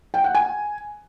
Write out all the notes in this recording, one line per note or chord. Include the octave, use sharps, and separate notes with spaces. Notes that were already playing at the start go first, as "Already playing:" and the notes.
G5
F#5
G#5